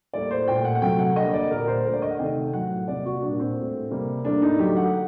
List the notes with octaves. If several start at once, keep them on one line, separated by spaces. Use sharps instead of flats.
A2 G3 A#3 D5
C5
A#2 A3 G5
F#5
F#5
C3 F#3 A3 G5
F#5
D3 G3 A#3 D#5
D5
A#2 G3 A#3 A#4
C5
D3 A3 A#4
D5
D#5
F#5
C3 D#3 A3 G5
A2 F#3 A3 F#5
C3 G3 A#3 D5
F#4
A#2 G3 A#3 D4
C4
A2 A3
C3 G3 A#3
A2 G3 A#3 D4
D#4
D3 F#3 A3 G4
F#5